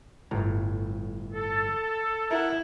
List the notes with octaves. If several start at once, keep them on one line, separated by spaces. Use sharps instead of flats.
G1 A2 A#5
A4
E4 A#4 F#5